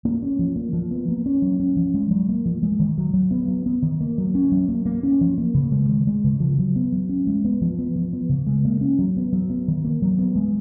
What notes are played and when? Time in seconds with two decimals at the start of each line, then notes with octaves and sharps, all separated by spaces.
0.05 A#3
0.23 C#4
0.39 F3
0.56 A#3
0.73 F3
0.91 B3
1.08 A#3
1.26 C#4
1.42 F#3
1.60 C#4
1.77 F3
1.94 G#3
2.11 F#3
2.29 A#3
2.46 F3
2.63 G#3
2.79 D#3
2.98 F#3
3.14 F#3
3.31 B3
3.48 F#3
3.66 B3
3.83 D#3
4.01 A#3
4.18 F#3
4.35 C#4
4.52 F#3
4.68 A#3
4.86 A#3
5.03 C#4
5.21 F3
5.38 A#3
5.54 C#3
5.72 G#3
5.89 D#3
6.07 G#3
6.24 C#3
6.40 F3
6.59 F#3
6.76 B3
6.92 F#3
7.09 C#4
7.27 G#3
7.45 B3
7.62 F3
7.79 B3
7.96 F3
8.13 B3
8.29 C#3
8.47 G#3
8.65 A#3
8.81 C#4
8.99 F#3
9.17 B3
9.33 F#3
9.50 B3
9.68 D#3
9.84 A#3
10.02 F#3
10.18 B3
10.36 G#3